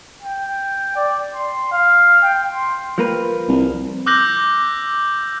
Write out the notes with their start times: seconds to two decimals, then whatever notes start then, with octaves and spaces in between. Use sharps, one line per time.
0.22 G5
0.96 D5
1.34 C6
1.72 F5
2.23 G5
2.52 C6
2.98 F3 A#3 B4
3.49 C2
4.06 D6 E6 F#6 G6 A#6 F#7